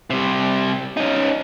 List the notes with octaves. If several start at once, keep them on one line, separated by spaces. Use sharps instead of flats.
C3 G3
C#4 D#4